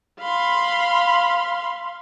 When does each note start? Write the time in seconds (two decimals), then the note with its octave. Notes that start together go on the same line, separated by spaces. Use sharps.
0.20 F5 B5 C6